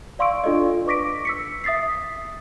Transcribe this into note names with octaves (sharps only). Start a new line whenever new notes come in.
D5 F5 C6 C#6 E6 D7
D4 F4 A4 D5 D#5
B4 C#6 D6 A#6 B6 D7
E6 B6 C#7
E5 D#6 A6 B6 C7